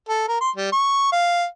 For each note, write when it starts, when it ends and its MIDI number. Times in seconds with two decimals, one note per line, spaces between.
0.09 0.24 69
0.28 0.38 70
0.41 0.50 84
0.56 0.70 55
0.72 1.10 85
1.12 1.45 77